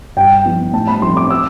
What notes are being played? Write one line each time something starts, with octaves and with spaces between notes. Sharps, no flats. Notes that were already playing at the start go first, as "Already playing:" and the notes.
G2 G5
F3 B3 E4
A2 A5
B5
F3 A3 C4 F4 C6
D6
E6